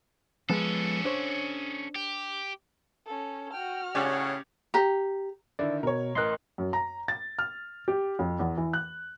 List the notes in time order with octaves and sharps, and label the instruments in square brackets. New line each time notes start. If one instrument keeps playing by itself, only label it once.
[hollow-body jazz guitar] F3 G#3 B3 [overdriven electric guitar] C#4 A4
[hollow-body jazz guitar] D4 C5 C#5
[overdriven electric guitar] G4
[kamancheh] C#4 A4
[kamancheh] F#4 F6 [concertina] G5
[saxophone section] A2 C#3 [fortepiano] C#4 G4 D5 [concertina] C#5 F#5
[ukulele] G4 A#5
[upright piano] D3 D#3 E4 [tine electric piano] D5
[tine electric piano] B2 [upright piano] A#4 C#5
[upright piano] A1 F#6 [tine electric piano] A#4 D#5 C6
[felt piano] F#2
A#5
A6
F6
G4
F2
E2
E3
F#6